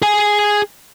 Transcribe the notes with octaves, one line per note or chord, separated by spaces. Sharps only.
G#4 G#5